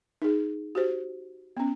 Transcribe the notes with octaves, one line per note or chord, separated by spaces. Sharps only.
D#4 G#4
F#4 G4 C5
B3 C#4